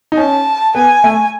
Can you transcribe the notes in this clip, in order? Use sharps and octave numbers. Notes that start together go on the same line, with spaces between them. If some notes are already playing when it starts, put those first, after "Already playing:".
D#4
C#4 A5
B3 G#5
A3